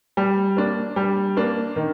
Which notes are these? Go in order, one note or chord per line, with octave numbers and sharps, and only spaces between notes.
G3
A#3 D4
G3
A#3 D4
D#3